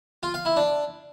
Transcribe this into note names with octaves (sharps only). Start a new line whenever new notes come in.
F4
F5
E4
D4